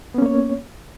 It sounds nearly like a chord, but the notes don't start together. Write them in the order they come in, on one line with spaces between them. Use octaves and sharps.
B3 C#4 A#3 C#5